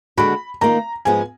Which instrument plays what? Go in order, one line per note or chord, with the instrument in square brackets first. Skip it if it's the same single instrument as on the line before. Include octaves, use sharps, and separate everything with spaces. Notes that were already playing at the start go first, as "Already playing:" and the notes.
[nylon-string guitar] D#2 D3 G#3 D4 F#4 [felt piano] B5
[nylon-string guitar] D#3 A#3 F4 [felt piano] A#5
[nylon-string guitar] G#2 F3 G#3 B3 [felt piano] G#5